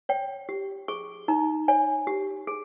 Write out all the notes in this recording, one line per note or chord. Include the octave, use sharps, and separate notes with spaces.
C#5 G5
G4
G#4 C#6
D#4 A#5
C#5 G#5
G4
G#4